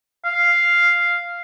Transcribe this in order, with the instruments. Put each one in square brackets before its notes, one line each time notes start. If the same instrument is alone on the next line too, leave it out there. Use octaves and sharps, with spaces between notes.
[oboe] F5